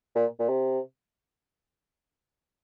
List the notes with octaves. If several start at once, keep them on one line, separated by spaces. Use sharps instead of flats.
A#2
A#2
C3